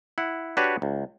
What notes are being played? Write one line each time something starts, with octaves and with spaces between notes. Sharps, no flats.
E4 F#5
D4 F#4 G4 B4 C#5 D5
C#2